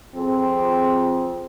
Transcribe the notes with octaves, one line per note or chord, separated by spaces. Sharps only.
F2 C4 G#4